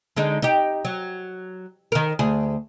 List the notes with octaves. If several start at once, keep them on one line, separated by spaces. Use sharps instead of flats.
D3 G#3 D#4
D#4 G4
F#3
D#3 A#4
D2 G#4